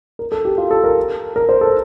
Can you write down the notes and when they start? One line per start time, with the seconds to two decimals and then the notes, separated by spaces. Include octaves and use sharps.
0.19 A#4
0.32 A4
0.45 G4
0.58 F4
0.71 A4
0.84 A#4
1.36 A#4
1.49 C5
1.61 A4